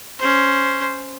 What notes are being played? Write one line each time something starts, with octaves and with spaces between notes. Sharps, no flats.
C#4 C5